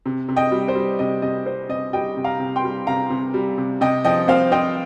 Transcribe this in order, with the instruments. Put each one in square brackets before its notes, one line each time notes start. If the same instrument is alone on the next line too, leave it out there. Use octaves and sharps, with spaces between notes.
[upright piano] C3
C3
D#5 G5
G3
C5
G3
C3 D#5
C3 D#5
C4 C5
C3 D#5
G3 D#5 G5
C3
F5 A#5
C3
G5 C6
G3
C3 F5 A#5
C3
G3
C3
C3 D#5 G5
F3 D#5 G5
C4 C5 F5
C4 D#5 G5